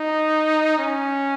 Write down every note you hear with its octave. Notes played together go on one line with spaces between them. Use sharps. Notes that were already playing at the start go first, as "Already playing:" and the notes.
Already playing: D#4
C#4